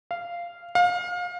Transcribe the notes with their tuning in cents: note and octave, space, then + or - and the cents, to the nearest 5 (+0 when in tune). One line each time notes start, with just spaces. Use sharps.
F5 -10
F5 +30